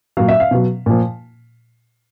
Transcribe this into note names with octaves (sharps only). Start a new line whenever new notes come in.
A#2 F#3 F5
E5
F5
B2 F#3
A#2 F3